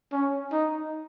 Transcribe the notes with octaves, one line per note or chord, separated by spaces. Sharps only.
C#4
D#4